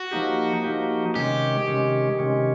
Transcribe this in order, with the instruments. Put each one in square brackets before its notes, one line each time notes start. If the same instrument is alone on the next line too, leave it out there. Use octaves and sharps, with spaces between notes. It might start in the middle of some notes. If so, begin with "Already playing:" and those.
Already playing: [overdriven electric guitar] F#4
[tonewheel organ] F3 A#3 D#4 G4
F3 A#3 D#4 G4
[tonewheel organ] C3 D#3 G#3 C#4 [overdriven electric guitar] G4
[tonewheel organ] C3 D#3 G#3 C#4
C3 D#3 G#3 C#4